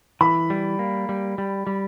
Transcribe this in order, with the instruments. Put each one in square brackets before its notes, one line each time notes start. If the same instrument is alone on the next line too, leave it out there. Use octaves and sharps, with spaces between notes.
[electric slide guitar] E3 [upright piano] B5
[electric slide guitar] G3
A#3
G3
G3
G3